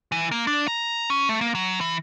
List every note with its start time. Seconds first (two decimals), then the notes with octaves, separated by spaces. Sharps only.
0.12 E3
0.31 A#3
0.47 D4
0.68 A#5
1.10 C#4
1.29 A3
1.41 A#3
1.55 F#3
1.81 E3